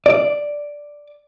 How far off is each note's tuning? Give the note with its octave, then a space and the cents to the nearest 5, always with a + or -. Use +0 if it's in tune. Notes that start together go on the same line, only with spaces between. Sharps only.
D5 +0